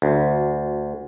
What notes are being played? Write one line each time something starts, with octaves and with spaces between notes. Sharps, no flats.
D2